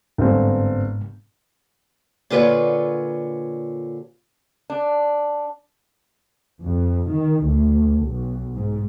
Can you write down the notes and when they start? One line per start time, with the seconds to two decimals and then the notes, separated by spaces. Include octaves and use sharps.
0.18 G1 G#2 C4
2.30 A#2 D3 F4 B4 C#5
4.70 D4
6.61 F2
7.13 D#3
7.46 D2
8.07 B1
8.55 G#2